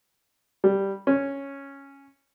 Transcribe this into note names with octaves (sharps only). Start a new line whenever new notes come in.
G3
C#4